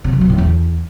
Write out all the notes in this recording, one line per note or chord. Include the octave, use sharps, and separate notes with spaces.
C3
F#3
B2
A2
E2